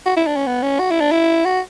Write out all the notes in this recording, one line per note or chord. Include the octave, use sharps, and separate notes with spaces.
F#4
E4
D4
C#4
B3
C#4
F#4
E4
D4
E4
F#4